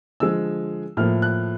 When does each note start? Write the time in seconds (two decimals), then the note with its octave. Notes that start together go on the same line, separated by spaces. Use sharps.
0.20 D3 F3 G#3 E6
0.97 A2 F3 A#3 F6
1.22 F#6